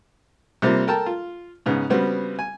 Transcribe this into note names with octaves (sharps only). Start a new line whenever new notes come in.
C3 G3 A#3 C4 F4
A4 A#4 G5 A5
F4
G#2 C#3 B3
C#3 G3 B3 C4 F#4
G#5